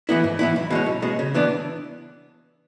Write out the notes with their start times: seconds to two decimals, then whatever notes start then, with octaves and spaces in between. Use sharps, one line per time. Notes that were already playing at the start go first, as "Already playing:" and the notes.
0.09 E3 B3 E4
0.24 G#2
0.39 E3 B3 E4
0.56 B1
0.70 B2 G#3 C#4
0.86 B1
1.02 B2 G#3 C#4
1.19 C#3
1.35 E3 B3 D4